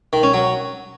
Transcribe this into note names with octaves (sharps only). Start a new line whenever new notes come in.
D#3
C#4
F#3